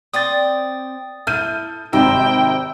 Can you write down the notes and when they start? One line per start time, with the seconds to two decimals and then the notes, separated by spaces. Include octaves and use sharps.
0.14 C4 D5 G5 D#6 A6
1.27 E4 A4 F6 G6 D#7
1.93 G#1 C3 D#4 A#4 C5 G5 E6